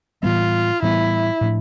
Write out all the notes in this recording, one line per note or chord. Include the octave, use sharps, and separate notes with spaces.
A2 E3 G3 B3 F4
A2 E3 G3 B3 E4
A2 F3 A3 D4